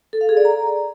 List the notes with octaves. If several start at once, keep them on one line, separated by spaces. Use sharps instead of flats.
A4
F5
G#4
D5
A#5